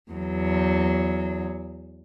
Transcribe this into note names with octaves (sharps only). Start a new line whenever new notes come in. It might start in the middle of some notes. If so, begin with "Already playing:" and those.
E2 F#3